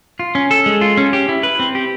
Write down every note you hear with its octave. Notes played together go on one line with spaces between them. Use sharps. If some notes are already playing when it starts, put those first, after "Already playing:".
F4
C#4
A4
G#3
F4
C#4
G4
E4
B4
C4
G4